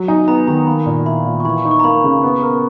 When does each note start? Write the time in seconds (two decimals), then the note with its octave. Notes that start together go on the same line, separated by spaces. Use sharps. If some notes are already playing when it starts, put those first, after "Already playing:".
Already playing: F#3
0.08 D#4 G#5
0.28 B3 A#5
0.47 D#3 A#5
0.67 A#3 B5
0.86 A#2
1.06 E4 B5
1.26 A#2
1.40 C#6
1.45 E3 B5
1.58 C#6
1.65 D#4
1.71 C#6
1.80 A#5
1.84 A#3 B5
2.04 C#3
2.23 B3
2.43 A#4